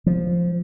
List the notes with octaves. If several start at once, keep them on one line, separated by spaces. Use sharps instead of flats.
F3